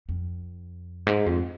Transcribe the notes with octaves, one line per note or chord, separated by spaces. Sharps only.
F2
G#2
F2